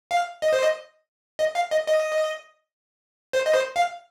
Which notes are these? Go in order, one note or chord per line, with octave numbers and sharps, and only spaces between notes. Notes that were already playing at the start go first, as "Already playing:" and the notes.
F5
D#5
C5
D#5
D#5
F5
D#5
D#5
C5
D#5
C5
F5